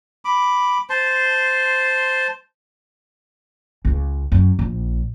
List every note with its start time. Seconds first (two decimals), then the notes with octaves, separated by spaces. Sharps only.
0.25 B5 D6
0.90 C5 A5 C6
3.85 C#2
4.32 F#2
4.59 A#1